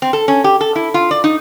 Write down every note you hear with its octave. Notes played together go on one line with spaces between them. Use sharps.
C4
A4
C#4
G4
A4
E4
F4
D5
D#4